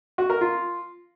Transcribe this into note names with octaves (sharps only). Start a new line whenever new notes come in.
F#4
A#4
F4